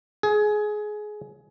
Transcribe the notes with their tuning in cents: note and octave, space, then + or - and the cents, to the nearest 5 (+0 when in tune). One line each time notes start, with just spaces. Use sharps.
G#4 +20